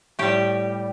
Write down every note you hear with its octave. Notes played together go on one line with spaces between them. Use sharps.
A2 G3 G4